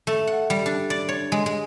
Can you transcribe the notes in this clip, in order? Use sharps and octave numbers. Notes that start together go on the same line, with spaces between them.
A3
F#5
G3
D4
D5
C#5
G#3
G#3